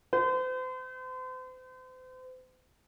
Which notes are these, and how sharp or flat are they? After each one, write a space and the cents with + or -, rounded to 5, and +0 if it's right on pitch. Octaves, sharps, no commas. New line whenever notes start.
C5 -40